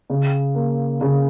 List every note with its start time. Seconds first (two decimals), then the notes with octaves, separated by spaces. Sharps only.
0.10 C#3
0.55 A#3
1.01 C#3